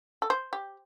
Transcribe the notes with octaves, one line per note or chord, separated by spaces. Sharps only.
A4
C5
G4